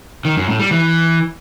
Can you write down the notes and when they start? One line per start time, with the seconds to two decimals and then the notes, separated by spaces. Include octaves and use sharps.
0.25 D#3
0.36 F#2
0.48 A2
0.60 G3
0.71 E3